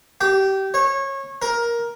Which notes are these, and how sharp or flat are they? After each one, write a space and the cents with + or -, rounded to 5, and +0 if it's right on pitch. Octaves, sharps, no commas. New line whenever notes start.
G4 -20
C#5 -25
A#4 +15